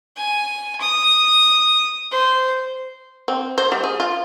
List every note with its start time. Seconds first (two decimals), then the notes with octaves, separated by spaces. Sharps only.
0.17 G#5
0.81 D#6
2.11 C5
3.28 C4
3.58 C5
3.72 G3
3.84 G#4
4.00 F4